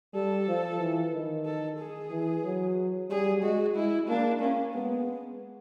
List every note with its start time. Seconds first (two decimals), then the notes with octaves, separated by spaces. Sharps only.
0.14 G3 A4
0.48 F3
0.80 E3
1.13 D#3
1.46 A4
1.79 G#4
2.11 E3
2.44 F#3
3.10 G3 G#4
3.43 G#3 F#4
3.76 G#3 E4
4.09 A#3 D4
4.41 A#3 C#4
4.74 G#3 B3